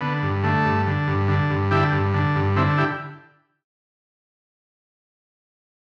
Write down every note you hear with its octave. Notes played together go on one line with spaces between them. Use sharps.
D3 B3
G2
D3 A3
G2
D3
G2
D3
G2
D3 E4 G4
G2
D3
G2
D3 C4 E4
E4 G4